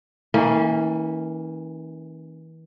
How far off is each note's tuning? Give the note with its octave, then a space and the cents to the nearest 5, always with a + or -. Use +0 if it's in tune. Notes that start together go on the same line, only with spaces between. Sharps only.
E3 -35 A#3 -15 C#4 +0